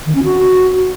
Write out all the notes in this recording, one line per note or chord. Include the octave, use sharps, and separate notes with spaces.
D#3
C#4
F#4